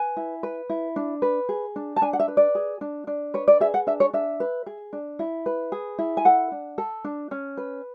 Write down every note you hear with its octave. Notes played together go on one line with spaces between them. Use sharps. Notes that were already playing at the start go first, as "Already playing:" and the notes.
Already playing: B4 G#5
E4
B4
E4
D4
B4
G#4
D4
A5
D4 G#5
F#5
E5
B4
D5
G#4
D4
D4
B4 C#5
D5
G#4 E5
F#5
D4 E5
C#5
D4 E5
B4
G#4
D4
E4
B4
G#4
E4
G#5
A4 F#5
D4
A4
D4
C#4
B4